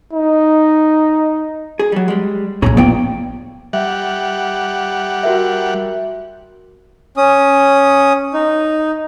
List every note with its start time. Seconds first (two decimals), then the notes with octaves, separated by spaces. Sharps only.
0.13 D#4
1.79 G#4
1.92 F#3 G3
2.08 G3 G#3
2.62 A#1 A#2 C#4 G#4 A#5
2.77 B3 F4 D5 G5
3.73 G3 E5 F#5
5.23 F#4 A#4 E5
7.17 C#4 D#6
8.34 D#4